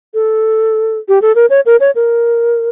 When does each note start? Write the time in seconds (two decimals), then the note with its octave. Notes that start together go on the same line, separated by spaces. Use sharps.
0.14 A4
1.08 G4
1.22 A4
1.35 A#4
1.50 C#5
1.66 A#4
1.80 C#5
1.95 A#4